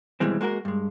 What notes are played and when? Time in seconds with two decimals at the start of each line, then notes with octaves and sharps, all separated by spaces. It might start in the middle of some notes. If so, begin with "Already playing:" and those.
0.20 D#2 B2 E3 G3 G#3 C4
0.41 G#3 A#3 F#4 G#4 A#4
0.65 G2 G#3